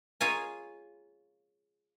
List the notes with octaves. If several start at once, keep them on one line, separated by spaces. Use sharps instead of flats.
F4 G#4 C#5 F5 G#5 A#5